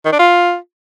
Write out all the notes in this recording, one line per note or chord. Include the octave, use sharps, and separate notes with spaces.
D#3
D4
F4